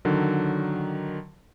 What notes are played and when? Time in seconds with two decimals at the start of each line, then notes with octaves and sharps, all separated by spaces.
0.05 D3 D#3 F#3